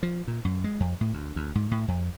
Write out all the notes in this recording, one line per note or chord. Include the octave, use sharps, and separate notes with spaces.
F3
A#2
F#2
G#3
F2
A2
D2
D2
G#2
A2
F2